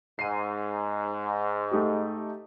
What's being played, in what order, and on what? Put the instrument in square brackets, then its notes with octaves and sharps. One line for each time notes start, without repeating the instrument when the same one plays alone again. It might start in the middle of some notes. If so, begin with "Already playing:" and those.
[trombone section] G#2 [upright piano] C7 D#7
[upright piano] A3 D#4 G4